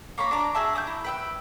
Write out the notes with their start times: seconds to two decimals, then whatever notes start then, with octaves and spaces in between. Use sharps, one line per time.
0.18 A#3 C#5 A#5 B5
0.31 D4 A#5 D6
0.55 F#4 G#4 E5 A5
0.73 D6 D#6 G6
0.87 E4
1.04 B4 G5 E6